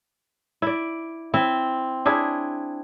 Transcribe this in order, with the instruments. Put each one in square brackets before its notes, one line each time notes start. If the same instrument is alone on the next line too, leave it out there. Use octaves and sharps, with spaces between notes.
[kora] E4 D5
[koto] C4 [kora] E4
[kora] D4 E4 G#4